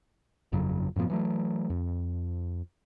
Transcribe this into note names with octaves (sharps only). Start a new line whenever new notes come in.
G1 F2 C#3 F#3
F#2 A2 F3 B3
E3 F#3 A3
F2